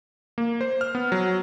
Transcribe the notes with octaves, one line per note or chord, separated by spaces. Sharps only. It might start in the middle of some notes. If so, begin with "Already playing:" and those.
A#3
C5
F6
B3
F#3